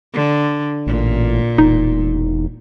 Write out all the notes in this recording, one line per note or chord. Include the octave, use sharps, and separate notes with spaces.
D3
A1 A#2
E1 D#4